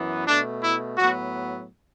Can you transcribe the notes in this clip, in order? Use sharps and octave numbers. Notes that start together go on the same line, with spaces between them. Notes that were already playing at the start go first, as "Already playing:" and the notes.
Already playing: F#2 E3 B3
B2 A3 D4
E4
A2 F#3 B3 F#4